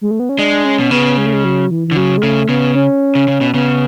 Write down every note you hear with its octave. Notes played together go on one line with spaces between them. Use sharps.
G#3
A3
B3
C#4
G#3 D4
C#4
B2
C#3 B3
G#3
A3
G#3
F#3
E3
D3 E3
C#3 F#3
G#3
C#3 A3
C#3 B3
C#4
C#3
C#3
B2
C#3 B3